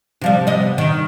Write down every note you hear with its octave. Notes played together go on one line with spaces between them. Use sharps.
C3 F3 G3
C3 B3 D#5
D#3